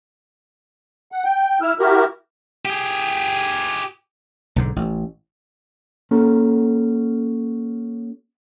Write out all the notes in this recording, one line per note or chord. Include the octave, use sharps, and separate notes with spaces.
F#5
G5
E4 E6 F6
E4 F#4 G4 A#4
G4 G#4
B1 G#2 D3
A1
A#3 C#4 F#4 A4